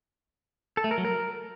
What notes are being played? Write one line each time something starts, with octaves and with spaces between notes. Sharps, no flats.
A4
A3
A#4
F#3
A#4